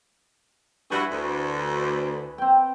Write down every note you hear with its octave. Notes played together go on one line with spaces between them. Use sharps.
G2 E4 F#4 B4 G#5
D2
C4 G5